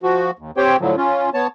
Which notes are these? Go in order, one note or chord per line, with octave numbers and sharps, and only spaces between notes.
F3 F#4
D#2
C4 G4 C5 C#5 G5
A2 D3 F3 F#3
C#4 F4
B3 C#5 A5